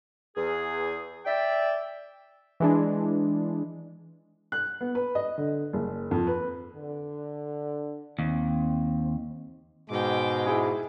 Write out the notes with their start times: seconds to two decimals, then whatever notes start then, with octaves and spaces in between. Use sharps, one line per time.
0.36 E2 G#4
1.26 D5 E5 G5
2.60 E3 G#3 D4
4.52 F#6
4.81 B3
4.95 B4
5.15 D#5
5.38 D3
5.73 F#1
6.11 F2
6.27 B4
6.76 D3
8.19 D#2 C4
9.90 G#2 B2 G#3 G5 D6
10.46 E4 G#4